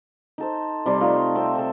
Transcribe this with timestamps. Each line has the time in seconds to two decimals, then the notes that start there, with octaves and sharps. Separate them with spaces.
0.38 D#4 A4 C5
0.86 C3 G3 D5 C6
1.00 A3 D#4 F4
1.35 C4 E5 G5
1.55 A4 C5